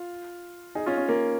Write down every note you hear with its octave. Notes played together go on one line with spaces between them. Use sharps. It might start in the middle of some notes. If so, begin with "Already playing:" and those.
Already playing: F4
D#4 G#4
C#4 F4
C#4
A#3